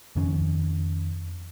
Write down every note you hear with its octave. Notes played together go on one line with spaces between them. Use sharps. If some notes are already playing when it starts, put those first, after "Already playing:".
F2 D#3 C#4